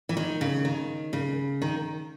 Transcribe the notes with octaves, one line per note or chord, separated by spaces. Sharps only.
E3
D#3
C#3
D#3
C#3
D#3